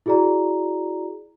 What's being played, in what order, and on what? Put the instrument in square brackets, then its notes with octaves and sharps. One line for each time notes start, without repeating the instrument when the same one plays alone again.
[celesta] E4 F#4 G#4 D5 A#5